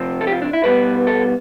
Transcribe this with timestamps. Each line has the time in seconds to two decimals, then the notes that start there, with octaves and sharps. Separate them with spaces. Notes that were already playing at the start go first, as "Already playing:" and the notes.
Already playing: C3 F3 C4
0.21 A4
0.27 G4
0.32 F4
0.42 D4
0.53 E4
0.64 B2 G3 B3 B4
1.07 A4